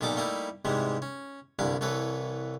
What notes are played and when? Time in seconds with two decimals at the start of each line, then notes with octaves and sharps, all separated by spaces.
0.01 B1 A#2 G3 D#4 A4 D6
0.17 G3 A3 A#3 D#4 E4 A4
0.65 G#2 C3 E3 G3 G#3
1.02 C#4
1.59 C2 G2 D3 E4 F5
1.81 C2 E3 A4 B4 C#5